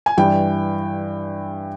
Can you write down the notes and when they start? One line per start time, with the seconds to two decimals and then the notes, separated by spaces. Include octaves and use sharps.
0.06 G#5
0.17 G2 E3 G3 G5